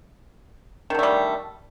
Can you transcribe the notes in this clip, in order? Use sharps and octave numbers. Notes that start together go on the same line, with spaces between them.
D3 D#3 G3 A3